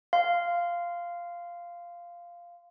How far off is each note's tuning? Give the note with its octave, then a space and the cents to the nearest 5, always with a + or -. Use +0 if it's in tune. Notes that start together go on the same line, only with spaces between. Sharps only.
F5 -5 C6 -15